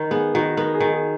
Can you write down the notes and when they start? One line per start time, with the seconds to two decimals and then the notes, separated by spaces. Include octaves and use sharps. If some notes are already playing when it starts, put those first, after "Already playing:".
Already playing: D#3 A#4
0.11 B3 G#4
0.34 D#3 F#4
0.57 B3 A#4
0.74 G#4
0.80 D#3
0.93 G#4